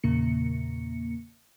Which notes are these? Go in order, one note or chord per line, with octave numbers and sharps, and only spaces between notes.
E2 A#2 C#3 A#3 C#7